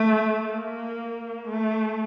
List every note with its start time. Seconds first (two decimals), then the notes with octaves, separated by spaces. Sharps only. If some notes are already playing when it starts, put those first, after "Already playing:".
Already playing: A3
0.45 A#3
1.48 A3